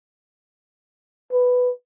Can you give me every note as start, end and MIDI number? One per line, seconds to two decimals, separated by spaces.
1.32 1.70 71